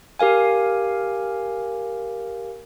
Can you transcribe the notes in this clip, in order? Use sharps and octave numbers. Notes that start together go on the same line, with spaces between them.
G4 A#4 F5 G#5